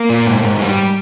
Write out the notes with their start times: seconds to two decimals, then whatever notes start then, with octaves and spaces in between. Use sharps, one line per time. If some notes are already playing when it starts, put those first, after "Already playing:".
Already playing: A#3
0.09 A#2
0.27 G#2
0.43 G#2
0.60 G3